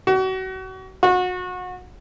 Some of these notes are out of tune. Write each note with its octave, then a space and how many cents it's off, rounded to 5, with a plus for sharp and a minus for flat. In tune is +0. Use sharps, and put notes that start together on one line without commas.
F#4 +30
F#4 -30